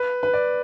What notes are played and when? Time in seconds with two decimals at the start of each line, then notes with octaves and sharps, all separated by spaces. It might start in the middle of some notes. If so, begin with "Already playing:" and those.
Already playing: B4
0.23 B4
0.33 D5